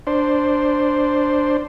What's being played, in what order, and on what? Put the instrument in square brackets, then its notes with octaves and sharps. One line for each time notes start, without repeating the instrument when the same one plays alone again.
[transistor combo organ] D4 C5